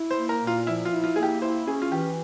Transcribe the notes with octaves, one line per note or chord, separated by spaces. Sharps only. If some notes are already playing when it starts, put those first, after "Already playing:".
Already playing: E4
C5
A#3
A#4
A#2
F4
F3 E4
F4
E4
F4
A#3 G#4
G4
E4 C5
C#4 G#4
F4
E3 G4